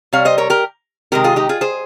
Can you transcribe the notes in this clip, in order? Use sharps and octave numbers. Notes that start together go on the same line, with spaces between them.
C3 G3 C#5 F5
C5 D#5
A#4 C#5
G4 A#4
C3 D#3 G#3 G4 A#4
F4 G#4
D#4 G4
F4 G#4
G#4 C5